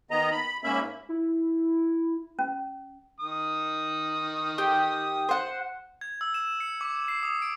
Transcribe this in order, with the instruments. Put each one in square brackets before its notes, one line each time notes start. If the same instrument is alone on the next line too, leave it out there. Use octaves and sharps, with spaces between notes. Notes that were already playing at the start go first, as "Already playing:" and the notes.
[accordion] D#3 B3 D#5 A#5
B5
G#2 A#3 C#4 E5 B5
[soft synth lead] E4
[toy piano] C#4
[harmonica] D#3 D#6
[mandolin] G4
C5 F#5
[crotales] G#6
E6
E7
C#7
D6
C7
D#6
D7